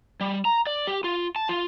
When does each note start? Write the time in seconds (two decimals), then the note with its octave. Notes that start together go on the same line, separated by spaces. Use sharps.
0.21 G3
0.45 A#5
0.67 D5
0.87 G4
1.04 F4
1.36 A5
1.49 F4